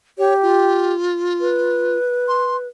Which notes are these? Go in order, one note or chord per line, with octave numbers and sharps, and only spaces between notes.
G4 C#5
F4
B4
C6